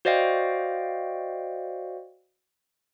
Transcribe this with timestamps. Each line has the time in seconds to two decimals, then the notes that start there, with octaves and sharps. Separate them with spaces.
0.05 F#4 C5 D5 D#5 F5 G5